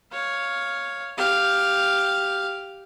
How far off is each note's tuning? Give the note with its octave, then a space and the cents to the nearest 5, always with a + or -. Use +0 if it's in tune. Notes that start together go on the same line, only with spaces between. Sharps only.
C#5 +0 F5 +5
G4 +0 F5 +0